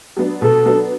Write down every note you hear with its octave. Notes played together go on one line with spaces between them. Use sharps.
F#3 B3 D4
B2 A4
F#3 B3 D4